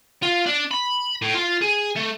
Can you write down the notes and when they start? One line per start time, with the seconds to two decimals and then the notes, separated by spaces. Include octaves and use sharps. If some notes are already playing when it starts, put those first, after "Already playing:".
0.22 F4
0.46 D4
0.71 B5
1.22 A2
1.35 F4
1.62 G#4
1.96 A3